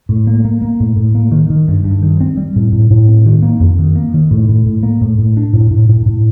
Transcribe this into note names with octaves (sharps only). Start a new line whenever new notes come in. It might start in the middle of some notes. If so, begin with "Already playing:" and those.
A2
A#3
A#3
A#3
A2
A2
A#3
D#3
D#3
G2
G2
D#3
C4
G3
A2
A2
A2
C4
D#3
A#3
F2
D#3
A#3
D#3
A2
A2
A2
A#3
A2
A2
D4
A2
A2
A2
A2